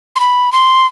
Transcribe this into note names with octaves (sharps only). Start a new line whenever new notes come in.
C6
B5
C6